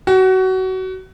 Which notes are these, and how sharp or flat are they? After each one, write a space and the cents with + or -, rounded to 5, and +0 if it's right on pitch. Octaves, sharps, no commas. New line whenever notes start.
F#4 +25